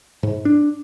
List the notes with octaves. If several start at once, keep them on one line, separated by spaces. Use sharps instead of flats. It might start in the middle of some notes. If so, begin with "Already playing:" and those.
G#2
D4